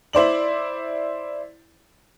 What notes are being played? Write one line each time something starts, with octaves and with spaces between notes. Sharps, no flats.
E4 C5 D5 F#7